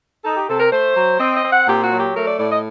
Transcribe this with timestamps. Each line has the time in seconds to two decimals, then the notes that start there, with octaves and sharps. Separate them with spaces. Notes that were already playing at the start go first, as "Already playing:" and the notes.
0.25 D#4 A4
0.37 G4
0.48 C3 A4
0.60 A#4
0.72 A3 C5
0.96 F#3
1.20 C4 D#5
1.37 D#5
1.44 C4
1.52 F#5
1.68 A#2 G4
1.84 F#4
1.92 F#3
2.00 G4
2.15 A3 A#4
2.27 D5
2.39 A2 D5
2.52 D#5